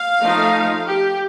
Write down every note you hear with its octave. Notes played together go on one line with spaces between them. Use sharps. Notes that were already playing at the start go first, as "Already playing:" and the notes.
Already playing: F5
F3 A3 D#4
G4